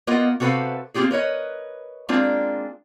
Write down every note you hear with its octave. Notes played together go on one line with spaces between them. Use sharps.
A#3 B3 F4 A#4 D#5
C3 F#4 A4 B4 C5 F5
A#3 C4 F4 G4 G#4
A#4 B4 C#5 D#5
G#3 A#3 C4 D4 F4